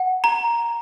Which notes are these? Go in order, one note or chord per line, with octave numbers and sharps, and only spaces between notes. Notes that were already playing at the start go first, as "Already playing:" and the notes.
Already playing: F#5
A#5